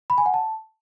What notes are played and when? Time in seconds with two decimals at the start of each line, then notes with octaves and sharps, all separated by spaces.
0.10 B5
0.18 G#5
0.26 F#5
0.34 A5